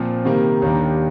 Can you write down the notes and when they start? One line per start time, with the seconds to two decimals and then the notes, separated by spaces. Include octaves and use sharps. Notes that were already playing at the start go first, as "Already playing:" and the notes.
Already playing: A#2 F3 C4
0.25 C3 D#3 G3 A#3
0.62 D#2 D#3 G3 A#3 D4